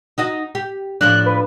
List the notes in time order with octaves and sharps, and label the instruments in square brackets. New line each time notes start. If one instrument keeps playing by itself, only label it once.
[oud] D#4 F#4 D#5
G4
[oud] A2 F3 D4 [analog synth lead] F#6
[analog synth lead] B4